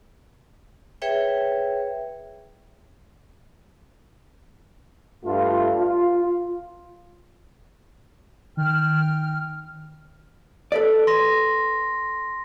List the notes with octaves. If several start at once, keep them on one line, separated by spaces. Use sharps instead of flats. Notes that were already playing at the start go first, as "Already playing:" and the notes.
G#4 B4 C#5 E5 G5
G2 A3 F4
F4
D#3 G5 F6
A4 B4 D5
C6 A#6